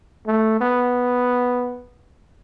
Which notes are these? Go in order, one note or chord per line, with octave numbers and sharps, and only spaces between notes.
A3
B3